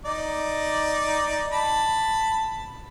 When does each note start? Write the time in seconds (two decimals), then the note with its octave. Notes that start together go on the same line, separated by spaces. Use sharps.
0.05 D#4 D5
1.52 A5 B5